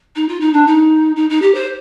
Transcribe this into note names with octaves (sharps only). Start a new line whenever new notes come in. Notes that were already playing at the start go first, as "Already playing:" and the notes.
D#4
F4
D#4
D4
D#4
D#4
D#4
G4
C5